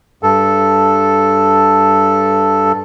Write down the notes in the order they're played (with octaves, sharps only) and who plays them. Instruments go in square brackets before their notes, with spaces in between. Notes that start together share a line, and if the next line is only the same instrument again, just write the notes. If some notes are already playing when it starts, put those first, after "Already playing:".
[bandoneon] G2 A4